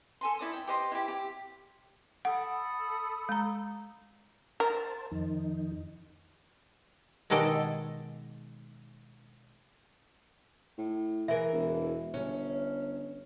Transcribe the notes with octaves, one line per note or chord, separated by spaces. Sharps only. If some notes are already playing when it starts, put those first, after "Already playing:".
A4 G#5 C6
E4 D5 D#6
G5
G4 C5 D#5 C6
E4 G4
G4
A4 F#5 B5 D#6
G#3 A#5
A#4 C5 A5
F2 D#3 D#4
B2 D#3 G#3 A4 D5 D#5
A2
E3 G#4 A#4 E5
E1
G1 C#4